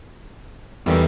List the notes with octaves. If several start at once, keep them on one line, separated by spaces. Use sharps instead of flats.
E2 D#3 E3 G3 B3 A4